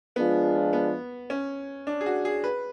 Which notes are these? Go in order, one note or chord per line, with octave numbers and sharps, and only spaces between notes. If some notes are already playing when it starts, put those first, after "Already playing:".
F3 G#3 B3 D4 F4 G#4
B3
C#4
D4
G#4
F#4
G#4
B4